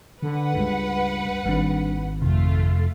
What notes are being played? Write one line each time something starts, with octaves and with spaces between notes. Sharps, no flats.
D3 B4 F#5
C#2 G2
G#1 G3 G#3 D4
F2 C3 A3 F4